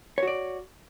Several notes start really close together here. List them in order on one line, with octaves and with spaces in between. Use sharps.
C#5 F#4 D5